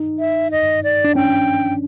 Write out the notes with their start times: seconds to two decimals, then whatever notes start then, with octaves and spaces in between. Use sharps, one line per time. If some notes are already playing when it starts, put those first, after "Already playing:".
Already playing: D#4
0.19 E5
0.51 D#5
0.84 D5
1.04 D4
1.15 C#4 G5